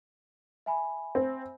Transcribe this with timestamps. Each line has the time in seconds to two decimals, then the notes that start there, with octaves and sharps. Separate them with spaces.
0.66 E5 G#5 B5
1.15 C4